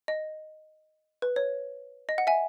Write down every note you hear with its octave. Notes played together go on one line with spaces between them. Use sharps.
D#5
B4
C#5
D#5
F#5
E5 G#5